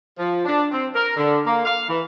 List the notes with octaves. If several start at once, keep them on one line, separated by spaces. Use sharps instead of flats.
F3
D4
C4
A#4
D3
A#3
F5
E3